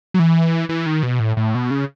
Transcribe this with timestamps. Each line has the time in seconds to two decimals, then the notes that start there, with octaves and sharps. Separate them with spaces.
0.14 F#3
0.19 E3
0.69 E3
0.86 D#3
1.03 B2
1.20 A2
1.37 A2
1.55 B2
1.71 C#3